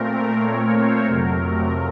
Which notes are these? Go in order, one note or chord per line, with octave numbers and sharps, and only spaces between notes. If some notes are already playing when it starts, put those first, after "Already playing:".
Already playing: A#2 A3 C4 A#4
C#5
C5
F2 C3 F#3 A3 A#4